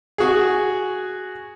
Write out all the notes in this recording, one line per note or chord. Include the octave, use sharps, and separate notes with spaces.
F#4 G#4